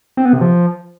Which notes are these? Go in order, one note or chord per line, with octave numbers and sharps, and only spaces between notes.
C4
B3
C3
F3